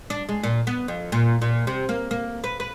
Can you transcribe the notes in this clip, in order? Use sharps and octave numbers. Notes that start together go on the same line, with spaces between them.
D4
G#3
A#2
B3
F2
A#2
A#2
C3
A#3
A#3
B4
B4